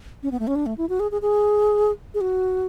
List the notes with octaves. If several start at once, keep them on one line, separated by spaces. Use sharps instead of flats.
C#4
B3
A3
C#4
D4
A3
E4
F#4
G#4
G#4
G#4
G#4
F#4